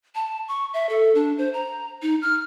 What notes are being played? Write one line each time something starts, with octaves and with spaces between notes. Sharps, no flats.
A5
C#6
E5
A4
D4
C5
A#5
D#4
F6